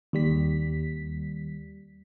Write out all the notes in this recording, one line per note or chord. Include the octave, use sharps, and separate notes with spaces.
D#2 G3 B6